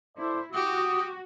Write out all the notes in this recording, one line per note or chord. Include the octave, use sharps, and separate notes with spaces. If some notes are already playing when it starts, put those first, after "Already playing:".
E4 A4 C5 D5
F#4 G4 D#6